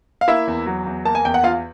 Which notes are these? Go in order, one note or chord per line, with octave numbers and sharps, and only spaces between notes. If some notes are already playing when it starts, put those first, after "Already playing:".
F5
A#3 E4 E5
E2
F#3
E2
A#3 A5
G#5
E2 G5
F#5
E2 F4 F5